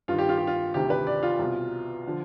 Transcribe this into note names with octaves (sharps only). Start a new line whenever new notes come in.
G2 D#3 F4
G4
F4
G4
F4
D2 C3 D#3 G4
B4
D5
F4
C2 B2
D3 F3